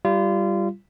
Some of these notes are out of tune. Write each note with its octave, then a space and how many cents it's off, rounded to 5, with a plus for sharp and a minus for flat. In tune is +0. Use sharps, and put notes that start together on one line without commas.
G3 -5 F4 -30